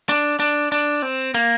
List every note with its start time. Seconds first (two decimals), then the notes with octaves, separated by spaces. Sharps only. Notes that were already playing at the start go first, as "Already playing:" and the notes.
0.09 D4
0.40 D4
0.72 D4
1.02 C4
1.34 A#3